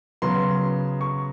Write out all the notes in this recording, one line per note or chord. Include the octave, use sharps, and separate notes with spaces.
C#3 F#3 B3 C6
C#6